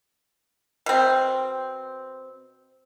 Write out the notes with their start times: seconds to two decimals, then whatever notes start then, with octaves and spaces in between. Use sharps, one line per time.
0.86 B2 C4